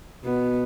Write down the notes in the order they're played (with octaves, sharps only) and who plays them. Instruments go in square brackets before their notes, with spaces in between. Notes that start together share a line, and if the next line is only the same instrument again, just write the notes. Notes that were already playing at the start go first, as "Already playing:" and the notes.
[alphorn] B2 [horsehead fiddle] B3